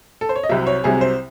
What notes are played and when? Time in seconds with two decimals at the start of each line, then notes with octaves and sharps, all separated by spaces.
0.21 A4
0.29 C5
0.36 C#5
0.43 D#5
0.49 C2 C3 F#3 E5
0.67 C#5
0.84 C2 C3 F#3 G#4
1.01 C5